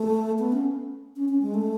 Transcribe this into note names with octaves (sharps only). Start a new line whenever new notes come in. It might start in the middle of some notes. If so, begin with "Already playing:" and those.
Already playing: A3
B3
C#4
C#4
C#4
G#3
A3